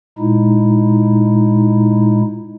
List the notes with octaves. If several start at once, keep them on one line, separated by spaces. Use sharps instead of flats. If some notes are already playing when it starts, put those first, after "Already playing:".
A#2 G#3 D#4 E4